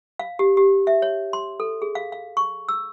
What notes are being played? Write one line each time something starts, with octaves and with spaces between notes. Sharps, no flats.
F5
G4
G4
E5
C#5
C6
A4
G#4
F5
F5
C#6
E6